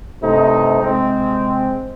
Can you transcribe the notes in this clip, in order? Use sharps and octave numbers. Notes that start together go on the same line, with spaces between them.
G2 C3 A3 D#4
C3 G#3 C4